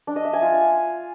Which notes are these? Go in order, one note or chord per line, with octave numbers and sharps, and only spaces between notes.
D4
D#5
E5
G#5
F4